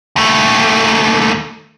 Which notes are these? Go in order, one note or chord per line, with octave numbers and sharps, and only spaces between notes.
D#2 A3